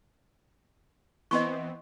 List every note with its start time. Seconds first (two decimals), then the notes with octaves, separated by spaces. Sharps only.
1.31 E3 B3 C4 D#5 C6 C#6